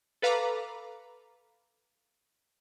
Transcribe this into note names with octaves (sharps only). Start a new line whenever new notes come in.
A4 B4 F5 A#5 B5 D6